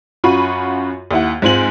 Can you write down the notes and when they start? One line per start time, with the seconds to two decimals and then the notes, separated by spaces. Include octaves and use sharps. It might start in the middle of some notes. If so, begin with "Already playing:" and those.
0.24 F#2 F4 F#4 B5 C#6 D#7
1.11 D#2 E4 F#5
1.42 G#2 C4 F4 G#5 F#7